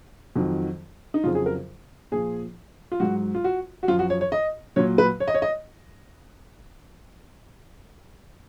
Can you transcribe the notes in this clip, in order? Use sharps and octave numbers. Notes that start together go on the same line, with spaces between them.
F2 D#3 F#3
D#4
F2 C#3 F#3 F4
G#4
A#4
A#2 F3 G#4
F4
G#2 F#3 F#4
F4
F#4
F#4
F#2 F3 F4
F#4
C#5
C#5
D#5
A#2 F#3 C#5
B4
C#5
D#5
C#5
D#5